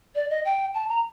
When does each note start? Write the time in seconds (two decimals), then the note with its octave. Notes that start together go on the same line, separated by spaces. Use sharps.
0.15 D5
0.30 D#5
0.45 G5
0.74 A5
0.89 A#5